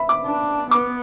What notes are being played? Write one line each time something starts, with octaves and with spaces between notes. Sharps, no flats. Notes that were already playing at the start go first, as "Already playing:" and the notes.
Already playing: E5 B5
D6
D4
B3 D6